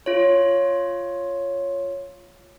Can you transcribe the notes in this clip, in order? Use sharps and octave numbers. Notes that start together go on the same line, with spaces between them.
F4 C#5